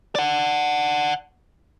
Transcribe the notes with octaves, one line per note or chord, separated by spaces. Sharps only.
D5 F#5